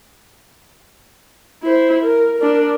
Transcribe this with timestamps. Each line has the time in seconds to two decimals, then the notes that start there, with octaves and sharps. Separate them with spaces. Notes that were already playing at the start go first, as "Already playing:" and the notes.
1.63 E4 C5
2.03 A#4
2.39 D4 A#4